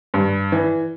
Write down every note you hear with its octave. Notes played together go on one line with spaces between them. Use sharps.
G2
E3